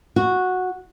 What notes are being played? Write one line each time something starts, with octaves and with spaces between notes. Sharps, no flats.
F#4